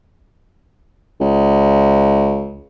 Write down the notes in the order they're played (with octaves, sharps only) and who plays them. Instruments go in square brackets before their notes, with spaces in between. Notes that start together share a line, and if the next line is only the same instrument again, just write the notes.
[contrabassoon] C#2